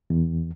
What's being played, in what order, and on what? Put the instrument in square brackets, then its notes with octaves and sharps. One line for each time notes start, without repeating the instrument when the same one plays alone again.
[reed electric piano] E2